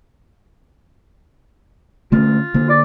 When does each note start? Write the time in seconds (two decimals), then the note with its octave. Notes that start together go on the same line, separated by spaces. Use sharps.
2.12 D3 A3 C#4 F4
2.54 D3 A#3
2.69 D5